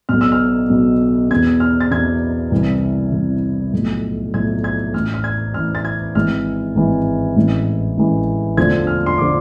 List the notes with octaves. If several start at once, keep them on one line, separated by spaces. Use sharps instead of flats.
B1 B2 F6
E6
F6
B1 B2
E2 B2 G#6
F6
A6
E2 B2 G#6
C2 C3 E3
C2 C3 E3
B1 A2 F3
B1 A2 F3 G#6
G#6
A1 A2 E3 F6
F6
G#6
A1 A2 E3 F6
A6
G#6
G#1 G#2 E3 F6
G#1 G#2 E3
A1 G#2 E3
A1 G#2 E3
E1 D2 D3 F3 G#6
F6
C6
D3 F3 D6